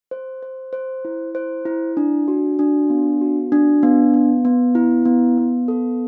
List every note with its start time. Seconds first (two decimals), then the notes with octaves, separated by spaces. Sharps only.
0.11 C5
0.42 C5
0.73 C5
1.05 E4
1.35 C5
1.65 E4
1.97 D4
2.28 F#4
2.59 D4
2.90 B3
3.21 F#4
3.52 D4
3.83 B3
4.14 B3
4.45 B3
4.75 E4
5.05 B3
5.38 B3
5.68 A4